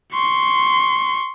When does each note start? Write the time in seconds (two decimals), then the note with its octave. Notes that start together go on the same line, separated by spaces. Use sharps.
0.13 C6 C#6